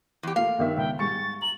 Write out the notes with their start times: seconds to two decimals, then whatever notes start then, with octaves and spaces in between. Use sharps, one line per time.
0.23 E2 G4
0.36 A3 A#3 F4 F5
0.58 G1 D#3 E5
0.77 C#2 G5
0.99 G#2 G3 G#3 C#6 A6 C#7
1.42 A#5 F#7